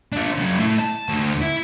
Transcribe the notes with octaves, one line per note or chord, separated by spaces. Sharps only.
D4 F4
C#3 F#3
A3 E4
A5
D2
E4